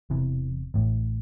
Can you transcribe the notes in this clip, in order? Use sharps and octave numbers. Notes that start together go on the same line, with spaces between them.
E1 E2 C3 E3
A1 A2